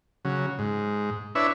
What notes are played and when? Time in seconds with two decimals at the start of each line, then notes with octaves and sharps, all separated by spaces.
0.25 C#3 F#3
0.59 G#2
1.35 D4 E4 B4 C#5 E5